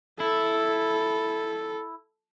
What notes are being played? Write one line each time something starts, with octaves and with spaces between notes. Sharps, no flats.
E4 A4